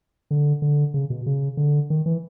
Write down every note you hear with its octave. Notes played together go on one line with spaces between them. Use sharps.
D3
D3
C#3
B2
C#3
D3
D#3
E3